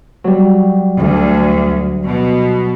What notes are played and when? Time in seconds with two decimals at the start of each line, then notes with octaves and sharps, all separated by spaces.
0.24 F#3 G3
0.98 D2
2.06 B2